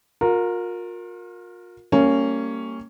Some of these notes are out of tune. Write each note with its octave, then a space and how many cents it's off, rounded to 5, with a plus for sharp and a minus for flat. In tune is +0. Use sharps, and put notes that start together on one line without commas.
F4 +40 A#4 -5
G3 +0 A#3 -25 C#4 +0